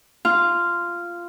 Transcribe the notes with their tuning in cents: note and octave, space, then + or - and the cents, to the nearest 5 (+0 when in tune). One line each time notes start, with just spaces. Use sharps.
F4 -10